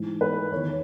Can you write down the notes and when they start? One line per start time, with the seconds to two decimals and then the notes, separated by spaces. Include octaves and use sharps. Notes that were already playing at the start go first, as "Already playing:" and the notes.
Already playing: G#2 E3
0.21 B4
0.52 E2 C#5
0.56 D#3